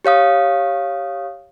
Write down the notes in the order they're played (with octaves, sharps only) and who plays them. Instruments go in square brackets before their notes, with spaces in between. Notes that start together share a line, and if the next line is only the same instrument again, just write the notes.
[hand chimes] G4 C#5 F5 D#6